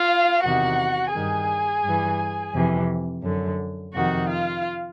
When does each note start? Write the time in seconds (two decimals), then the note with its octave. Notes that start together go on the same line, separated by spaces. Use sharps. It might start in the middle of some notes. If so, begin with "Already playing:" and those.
Already playing: F4 F5
0.44 E2 C3 D#3 F#4 F#5
1.14 G2 D#3 G#4 G#5
1.83 G2 E3
2.54 F2 C3 E3
3.23 F#2 D3
3.93 F2 C3 D#3 F#4 F#5
4.28 F4 F5